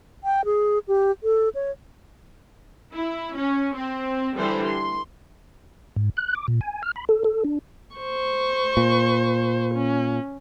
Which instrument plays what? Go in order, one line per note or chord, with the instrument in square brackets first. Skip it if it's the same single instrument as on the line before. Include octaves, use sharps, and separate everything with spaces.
[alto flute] G5
G#4
G4
A4
C#5
[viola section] E4
C#4
C4
D3 E3 G3 C5
C6
[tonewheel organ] G#2
F#6
D6
A#2
G#5
F6
B5
A4
A4
D4
[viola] C5 C#6
[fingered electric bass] A#2
[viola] C#4